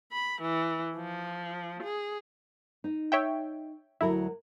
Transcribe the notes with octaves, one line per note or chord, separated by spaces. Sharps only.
B5
E3
F3
G#4
D#4
C#5 E5 G5
D2 F#3 E4 A#4